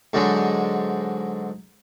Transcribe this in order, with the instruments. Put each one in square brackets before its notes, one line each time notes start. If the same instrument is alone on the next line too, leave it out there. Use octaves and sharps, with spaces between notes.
[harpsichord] G#2 D3 F#3 G#3